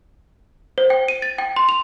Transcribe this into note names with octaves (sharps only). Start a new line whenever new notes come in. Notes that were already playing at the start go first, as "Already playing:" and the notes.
C5
G5
D#7
A6
G5
C6
F7